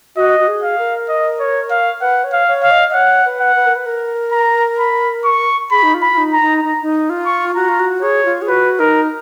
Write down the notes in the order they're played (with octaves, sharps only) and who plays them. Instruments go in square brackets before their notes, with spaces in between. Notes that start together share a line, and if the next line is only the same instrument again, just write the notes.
[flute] F#4 [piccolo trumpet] D#5
[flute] F#4
G#4
[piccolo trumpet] F5
[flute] A#4
[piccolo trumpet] D#5
C#5
F5
[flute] B4 [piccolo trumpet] F#5
[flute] C#5
[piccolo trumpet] F5
[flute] C#5
[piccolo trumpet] F5
[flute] D#5
D#5
[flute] C#5 [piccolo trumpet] F#5
[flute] B4
[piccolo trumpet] F#5
[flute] B4
A#4
B4
A#4
[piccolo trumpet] A#5
B5
C#6
[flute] G#4 [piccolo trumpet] B5
[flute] D#4
F4
[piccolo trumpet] B5
[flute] F4
D#4
[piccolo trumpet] A#5
[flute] D#4
[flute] D#4 [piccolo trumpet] A#5
[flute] D#4
F4
[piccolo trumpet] C#6
[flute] F#4 [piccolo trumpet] A#5
[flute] F4
F#4
[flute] G#4 [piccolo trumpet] C#5
[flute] F4
G#4
[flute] F#4 [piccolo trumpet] B4
[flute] D#4 [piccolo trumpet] A#4